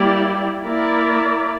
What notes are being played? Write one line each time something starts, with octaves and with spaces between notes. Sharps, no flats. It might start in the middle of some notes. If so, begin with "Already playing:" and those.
Already playing: G3 A#3 E4 G4 D5
A#3 E4 A#4 D5